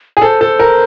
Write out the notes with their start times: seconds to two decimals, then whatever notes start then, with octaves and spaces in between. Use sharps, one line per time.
0.17 G#4
0.22 A4 C5
0.41 A4
0.59 A#4